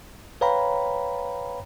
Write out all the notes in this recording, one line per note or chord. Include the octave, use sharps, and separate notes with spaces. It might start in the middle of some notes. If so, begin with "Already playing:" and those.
B4 C#5 F5 G5 A#5 B5